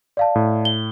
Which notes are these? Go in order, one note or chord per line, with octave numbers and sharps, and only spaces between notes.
D5 F5 A5
A2
G7